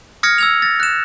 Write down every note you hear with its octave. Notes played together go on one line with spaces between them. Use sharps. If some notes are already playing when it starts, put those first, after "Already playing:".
D#6 F6 G#6 A#6 C#7
E6 G#6 F7
A6 A#6
F#6 E7